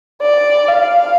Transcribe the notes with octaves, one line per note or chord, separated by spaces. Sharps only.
D5
F5